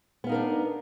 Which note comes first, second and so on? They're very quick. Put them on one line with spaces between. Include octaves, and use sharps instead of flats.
B3 F5 D#4 A#4 D4